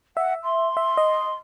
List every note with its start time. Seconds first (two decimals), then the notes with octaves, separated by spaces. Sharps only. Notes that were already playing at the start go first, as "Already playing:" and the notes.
0.17 E5 F#5
0.44 C6
0.77 E5
0.97 D#5